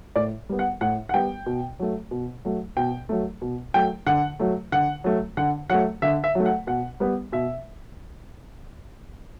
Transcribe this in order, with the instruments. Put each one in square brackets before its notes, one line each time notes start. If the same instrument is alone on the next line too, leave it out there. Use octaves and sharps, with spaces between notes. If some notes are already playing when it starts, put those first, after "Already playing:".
[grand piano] A2 D5
G3 B3
F#5
A2 F#5
F#5
G3 B3 G5
B2
F#3 A3
B2
F#3 A3
B2 G5
F#3 A3
B2
F#3 A3 G5
D3 F#5
F#3 A3
D3 F#5
F#3 A3
D3 F#5
F#3 A3 F#5
D3 E5
E5
F#3 A3
F#5
B2 F#5
G3 B3
B2 E5